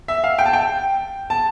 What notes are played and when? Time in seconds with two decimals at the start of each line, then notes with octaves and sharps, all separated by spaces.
0.08 E5
0.24 F5
0.39 G5
0.46 A5
0.53 G5
1.30 A5